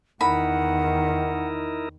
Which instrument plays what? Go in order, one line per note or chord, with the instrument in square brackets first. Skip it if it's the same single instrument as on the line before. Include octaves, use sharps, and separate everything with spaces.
[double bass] E2 D#3 [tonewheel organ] D#4 E4 A#4 [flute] F#5 [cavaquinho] B5